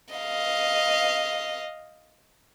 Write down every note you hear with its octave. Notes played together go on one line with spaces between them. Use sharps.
D#5 F5